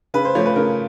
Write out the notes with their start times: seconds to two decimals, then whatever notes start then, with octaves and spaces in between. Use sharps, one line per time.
0.14 C#3 B4
0.25 C5
0.35 F3 A3 C#5
0.45 B4
0.56 C#3 A#4